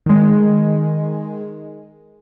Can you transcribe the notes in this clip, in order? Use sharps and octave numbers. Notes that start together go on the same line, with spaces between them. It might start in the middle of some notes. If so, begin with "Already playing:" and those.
D#3 G#3